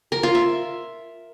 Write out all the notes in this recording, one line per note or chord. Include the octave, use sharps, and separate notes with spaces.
A#4
F4
E5